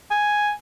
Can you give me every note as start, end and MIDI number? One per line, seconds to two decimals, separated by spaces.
0.11 0.51 80